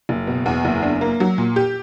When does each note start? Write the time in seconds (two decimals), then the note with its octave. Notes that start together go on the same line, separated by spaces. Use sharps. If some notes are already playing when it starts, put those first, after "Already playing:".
0.09 F#1
0.27 B2
0.46 E2
0.65 F#1
0.83 D4
1.01 A#3
1.20 F#3
1.38 A#2
1.56 G4